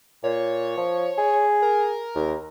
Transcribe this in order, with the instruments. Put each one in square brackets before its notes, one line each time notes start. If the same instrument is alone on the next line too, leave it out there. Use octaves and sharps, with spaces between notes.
[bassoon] A#2 [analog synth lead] C#5
[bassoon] F3
G#4
[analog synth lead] A#4
[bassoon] D#2